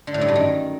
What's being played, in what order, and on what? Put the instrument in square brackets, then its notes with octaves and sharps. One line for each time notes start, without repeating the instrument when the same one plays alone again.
[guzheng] D3
A2
G2
F#2
D#3